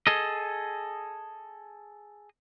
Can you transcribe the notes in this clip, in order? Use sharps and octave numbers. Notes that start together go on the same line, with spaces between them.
G#4 A4 D#5